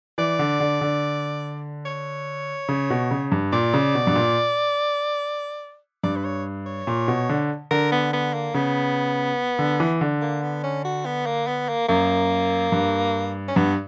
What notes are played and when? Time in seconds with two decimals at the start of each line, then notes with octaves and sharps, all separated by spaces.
0.18 E3 D5
0.39 D3
0.60 D3
0.81 D3
1.85 C#5
2.69 C#3
2.90 B2
3.11 C#3
3.32 G2
3.53 A#2 D5
3.74 C#3
3.95 B2
4.07 G2
4.16 A#2
6.03 G2 D5
6.16 B4
6.25 C#5
6.66 C#5
6.87 A#2
7.08 B2
7.29 D3
7.71 D3 A#4
7.92 B3
8.13 B3
8.34 A#3
8.54 C#3 B3
9.59 D3
9.80 E3
10.01 D3
10.22 A#3
10.43 B3
10.63 C#4
10.85 F#4
11.05 B3
11.26 A#3
11.47 B3
11.68 A#3
11.88 F#2 A#3
12.72 G2
13.48 C#4
13.56 G2 B3